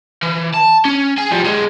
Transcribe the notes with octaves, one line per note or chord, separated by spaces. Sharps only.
E3
A5
C#4
G#4 G#5
F3 G3
B1 G#3